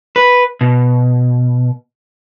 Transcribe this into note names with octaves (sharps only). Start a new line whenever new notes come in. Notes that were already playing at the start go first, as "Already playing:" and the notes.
B4
B2